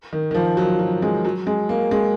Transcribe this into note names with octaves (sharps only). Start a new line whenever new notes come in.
D#3
D#3
F3
F#3
F#3
G#3
F#3
G#3
A#3
G#3